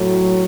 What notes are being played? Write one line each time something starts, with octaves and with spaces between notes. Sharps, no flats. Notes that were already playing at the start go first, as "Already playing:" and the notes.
Already playing: A2 F#3